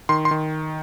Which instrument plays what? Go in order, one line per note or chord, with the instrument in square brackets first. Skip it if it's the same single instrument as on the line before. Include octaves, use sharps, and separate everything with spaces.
[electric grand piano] D#3 C6
C6
D#3